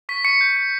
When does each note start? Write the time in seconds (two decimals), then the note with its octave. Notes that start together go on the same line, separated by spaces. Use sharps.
0.09 C#6 B6
0.24 C#6 C#7
0.41 G6
0.57 G6